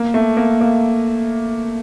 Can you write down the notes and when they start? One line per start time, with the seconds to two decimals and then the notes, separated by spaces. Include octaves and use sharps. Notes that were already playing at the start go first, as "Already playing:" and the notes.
Already playing: A#3
0.14 A3
0.37 A#3
0.61 A#3